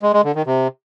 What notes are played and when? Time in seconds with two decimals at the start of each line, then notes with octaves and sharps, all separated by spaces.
0.02 G#3
0.13 G#3
0.24 D3
0.35 D#3
0.46 C3